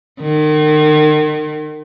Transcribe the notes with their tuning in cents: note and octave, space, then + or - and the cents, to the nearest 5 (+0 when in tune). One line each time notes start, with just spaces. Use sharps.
D#3 -35